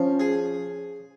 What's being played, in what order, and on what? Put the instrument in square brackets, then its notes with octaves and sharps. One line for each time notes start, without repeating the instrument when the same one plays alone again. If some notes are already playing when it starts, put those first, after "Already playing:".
Already playing: [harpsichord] F3 [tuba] C#4
[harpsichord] G#4